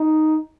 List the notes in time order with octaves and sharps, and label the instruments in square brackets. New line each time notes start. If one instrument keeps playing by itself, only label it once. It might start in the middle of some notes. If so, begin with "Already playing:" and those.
Already playing: [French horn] D#4